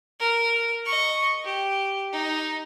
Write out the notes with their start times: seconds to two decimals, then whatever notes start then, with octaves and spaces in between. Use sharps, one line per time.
0.20 A#4
0.85 D#5 C#6
1.44 G4
2.12 D#4